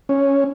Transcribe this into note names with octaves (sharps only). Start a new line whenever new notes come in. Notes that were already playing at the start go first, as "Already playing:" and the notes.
C#4